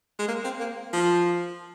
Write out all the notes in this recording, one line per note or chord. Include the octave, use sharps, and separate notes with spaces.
G#3
A#3
C4
A#3
F3